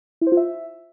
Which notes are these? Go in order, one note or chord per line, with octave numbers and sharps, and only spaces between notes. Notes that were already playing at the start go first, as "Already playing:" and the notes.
E4
C5
F4
E5